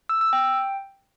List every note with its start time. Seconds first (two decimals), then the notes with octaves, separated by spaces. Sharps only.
0.09 E6
0.21 E6
0.33 G5